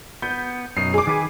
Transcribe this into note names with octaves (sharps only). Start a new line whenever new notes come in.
B3 G6
F#2 B2 D#4 C7
G#4 D6
D#3 B4 G#5